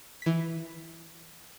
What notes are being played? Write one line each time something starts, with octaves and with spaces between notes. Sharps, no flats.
E3 B6